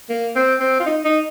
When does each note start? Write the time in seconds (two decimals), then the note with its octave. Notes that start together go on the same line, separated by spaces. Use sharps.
0.10 A#3
0.36 C4
0.60 C4
0.80 F4
0.86 D#4
1.05 D#4